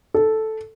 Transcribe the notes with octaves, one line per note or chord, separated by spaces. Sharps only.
A4